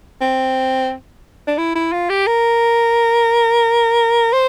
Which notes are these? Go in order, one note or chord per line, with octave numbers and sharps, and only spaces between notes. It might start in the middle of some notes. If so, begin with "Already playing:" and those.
C4
D4
E4
E4
F4
G4
A#4
C5